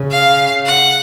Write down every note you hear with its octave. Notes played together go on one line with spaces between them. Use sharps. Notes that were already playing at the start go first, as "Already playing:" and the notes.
Already playing: C#3
F5
F#5